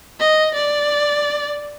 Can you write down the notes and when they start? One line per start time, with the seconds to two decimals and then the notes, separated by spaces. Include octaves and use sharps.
0.20 D#5
0.54 D5